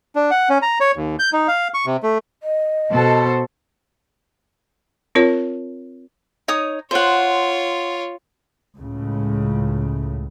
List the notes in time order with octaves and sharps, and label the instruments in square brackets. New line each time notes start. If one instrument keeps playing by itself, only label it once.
[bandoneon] D4
F#5
C#4
A#5
C#5
D#2
G6
D#4
F5
C#6
C3
A3
[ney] D#5
[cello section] B2 A4 C5
[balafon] C4 F4 A#4 C#5
[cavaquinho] D#4 C#5 D#6
[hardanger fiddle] F4 C#5 [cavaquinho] C5 F#5
[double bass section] C#2 A2 C#3